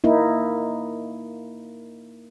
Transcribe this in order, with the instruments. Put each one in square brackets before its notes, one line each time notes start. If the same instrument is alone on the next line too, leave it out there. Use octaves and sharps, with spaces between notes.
[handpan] A#3 D#4 E4